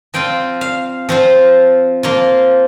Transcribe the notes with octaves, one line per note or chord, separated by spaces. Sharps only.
F3 C4 F4 G5
F5
F3 C4 F4
F3 A#3 F4